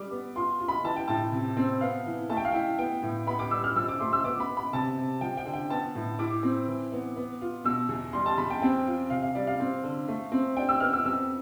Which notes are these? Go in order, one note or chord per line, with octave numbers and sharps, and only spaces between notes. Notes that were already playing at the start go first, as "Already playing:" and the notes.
Already playing: G3 D6
B3
F4 C6
F4
B5
E3 A5
G5
A2 A5
C3
C4
B3 F5
E3
A3 A5
G5
F5
E4 G5
B3 G5
A2
B3 B5
D6
G3 E6
F6
F3 E6
D6
A3 C6
E6
B3 D6
B5
B3
B5
C3 A5
C3
F3 G5
G5
D3
G5
B3 A5
A2
E4 D6
C4
E3
B3
B3
F4
B2 E6
E2
G3 C6
A5
E2 B5
G5
C4 G5
F4
C3 F5
F5
G3 D5
F5
C4
D3
A3
C4
D4 G5
E6
B3 F6
E6
F2 E6